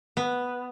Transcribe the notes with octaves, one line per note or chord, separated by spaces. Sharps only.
B3